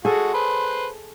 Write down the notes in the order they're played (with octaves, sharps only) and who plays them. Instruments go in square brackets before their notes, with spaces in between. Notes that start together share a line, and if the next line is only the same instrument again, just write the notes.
[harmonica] G#3 F#4 [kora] G#4 A4
[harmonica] B4 C5